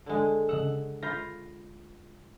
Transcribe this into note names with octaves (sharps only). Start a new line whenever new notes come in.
D3 G#3
C#3 D#5 F#5 E6
F4 B5 G6 A#6